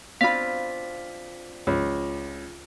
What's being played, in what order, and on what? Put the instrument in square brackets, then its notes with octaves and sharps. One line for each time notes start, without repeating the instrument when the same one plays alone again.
[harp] C4 D4 F4 [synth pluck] F5 B5 [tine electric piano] B6
[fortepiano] C#2